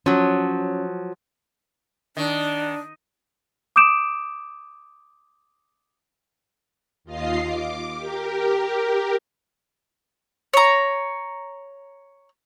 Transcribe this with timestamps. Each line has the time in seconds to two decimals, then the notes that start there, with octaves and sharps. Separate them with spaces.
0.06 F3 F#3 C#4
2.17 D#3 D4
3.76 D6 D#6 G6 D7 E7
7.04 D#2 F4 D#5 F5 C7
7.42 D6
7.94 G4 A#4
10.54 C#5 A#5